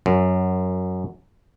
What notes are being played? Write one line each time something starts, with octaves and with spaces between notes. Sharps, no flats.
F#2